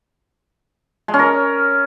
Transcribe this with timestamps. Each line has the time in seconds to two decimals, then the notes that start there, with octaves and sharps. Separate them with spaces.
1.08 G#3
1.14 C#4
1.19 A#4